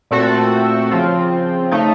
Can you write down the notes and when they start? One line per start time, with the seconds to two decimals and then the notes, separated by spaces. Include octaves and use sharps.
0.11 A#2 A3 C4 F#4 A4
0.91 C#3 F3 C4 F4
1.71 C#3 A3 D#4